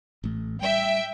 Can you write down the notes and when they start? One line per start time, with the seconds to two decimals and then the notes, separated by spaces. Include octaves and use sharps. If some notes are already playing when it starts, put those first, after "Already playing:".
0.24 A1 A2 A3
0.61 G3 E5 G5